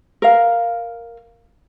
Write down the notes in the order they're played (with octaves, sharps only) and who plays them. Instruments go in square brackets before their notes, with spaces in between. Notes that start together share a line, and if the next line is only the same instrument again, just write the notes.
[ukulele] A#4 F5